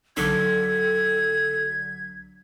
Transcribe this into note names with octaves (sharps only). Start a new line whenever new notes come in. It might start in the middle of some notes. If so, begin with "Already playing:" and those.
B1 D3 F#3 A4 G#6 B6